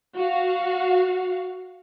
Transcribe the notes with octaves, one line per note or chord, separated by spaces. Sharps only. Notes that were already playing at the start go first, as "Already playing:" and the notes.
F#4 F5 F#5